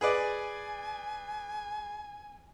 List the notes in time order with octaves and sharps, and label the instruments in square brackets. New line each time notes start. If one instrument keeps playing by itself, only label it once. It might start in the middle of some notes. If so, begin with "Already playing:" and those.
[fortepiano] G#4 B4 D5 [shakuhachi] G#5